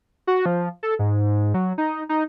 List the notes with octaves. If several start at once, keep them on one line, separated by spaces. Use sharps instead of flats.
F#4
F3
A4
G#2
F#3
D#4
D#4